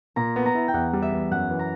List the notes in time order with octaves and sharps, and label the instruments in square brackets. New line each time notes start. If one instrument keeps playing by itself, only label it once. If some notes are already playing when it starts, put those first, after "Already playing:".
[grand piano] A#2 [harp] A#5
[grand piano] B3
[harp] A#5
[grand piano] E4
[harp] G5
[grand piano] E2 [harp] F#5
[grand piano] G3
[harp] E5
[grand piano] E2
[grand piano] F#2 [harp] F#5
[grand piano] E3
[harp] A#5